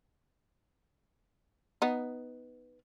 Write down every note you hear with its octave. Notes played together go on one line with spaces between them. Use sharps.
B3 D#4